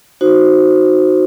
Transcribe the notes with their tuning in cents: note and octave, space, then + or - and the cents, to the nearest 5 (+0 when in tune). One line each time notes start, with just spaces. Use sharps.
D#4 +0 F#4 -5 C5 +0